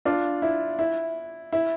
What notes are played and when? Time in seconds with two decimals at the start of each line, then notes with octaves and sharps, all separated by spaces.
0.05 D4 F4
0.42 E4
0.79 E4
1.53 E4